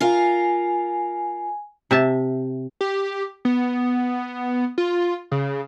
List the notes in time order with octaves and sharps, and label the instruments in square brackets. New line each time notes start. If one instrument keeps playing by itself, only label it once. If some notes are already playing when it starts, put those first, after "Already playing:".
[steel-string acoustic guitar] F4 A#4 F5 [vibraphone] G#5
[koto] C3 E5 A5
[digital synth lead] G4
B3
F4
C#3